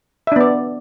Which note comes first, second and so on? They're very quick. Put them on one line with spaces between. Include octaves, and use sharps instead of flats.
E5 D4 B3 D5